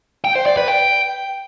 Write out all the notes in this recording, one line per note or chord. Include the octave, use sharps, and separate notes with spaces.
G5
C5
D5
B4
G5